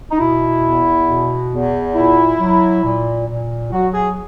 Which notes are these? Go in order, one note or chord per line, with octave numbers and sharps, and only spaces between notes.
D#4
B2 E4
E2
B2
E2
A#2 E4
F#3
A#2
A#2
F#3 F#4
G#4